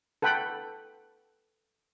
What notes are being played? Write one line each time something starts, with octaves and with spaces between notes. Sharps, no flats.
A4 B4 F#5 G5 B5